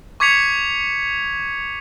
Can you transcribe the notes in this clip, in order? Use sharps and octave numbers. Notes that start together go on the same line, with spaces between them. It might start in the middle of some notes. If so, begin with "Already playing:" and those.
C#6 D6 G#6 B6 C#7 F7